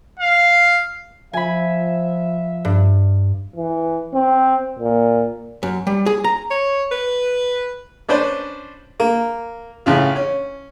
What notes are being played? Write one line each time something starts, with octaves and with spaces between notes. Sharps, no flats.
F5
F3 E5 G#5 B5
G2
E3
C4
A#2
F#2
G3
G#4
A#5
C#5
B4
C#4 D4 B4 C5 D5
A#3
A1 C#3 F4
C#4